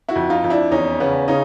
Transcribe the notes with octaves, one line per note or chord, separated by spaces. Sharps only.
E4 F#4
F2
D#4 F4
F2
D4 E4
E2 C#4 D#4
C#3 B3 C#4
C#3 C#4 D#4